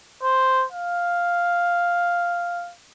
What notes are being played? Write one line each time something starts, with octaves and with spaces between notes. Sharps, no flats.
C5
F5